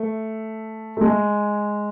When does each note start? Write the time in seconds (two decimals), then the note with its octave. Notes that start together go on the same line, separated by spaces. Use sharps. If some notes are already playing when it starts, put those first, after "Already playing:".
Already playing: A3
0.97 A3
1.01 G#3